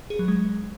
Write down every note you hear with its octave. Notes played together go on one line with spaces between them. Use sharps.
G#4
F#3
G#3